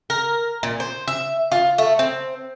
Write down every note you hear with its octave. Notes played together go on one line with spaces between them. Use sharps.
A#4
A#2
C5
E5
F4
A3
C4